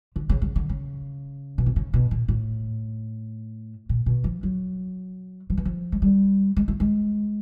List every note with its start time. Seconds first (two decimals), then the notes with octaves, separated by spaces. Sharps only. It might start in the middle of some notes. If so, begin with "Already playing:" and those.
0.16 D3
0.30 C#3
0.42 C#3
0.56 D3
0.69 C#3
1.58 B2
1.66 C3
1.76 C#3
1.94 B2
2.11 A#2
2.28 A2
3.89 A#2
4.06 B2
4.24 F3
4.43 F#3
5.50 F3
5.57 E3
5.65 F3
5.92 G#3
6.02 G3
6.56 G#3
6.68 A3
6.80 G#3